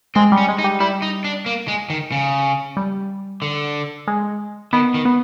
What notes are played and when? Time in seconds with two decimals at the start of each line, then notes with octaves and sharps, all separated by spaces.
0.15 G#3 C4
0.32 G3
0.38 C#4
0.49 G#3
0.59 D#4
0.64 G3
0.80 G3 E4
1.02 D#4
1.24 D4
1.46 A#3
1.68 G#3
1.90 D#3
2.12 C#3
2.77 G3
3.42 D3
4.07 G#3
4.73 D#3 B3
4.94 D#3
5.05 B3